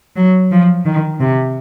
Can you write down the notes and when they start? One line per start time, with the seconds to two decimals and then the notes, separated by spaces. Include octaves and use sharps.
0.16 F#3
0.51 F3
0.85 D#3
1.20 C3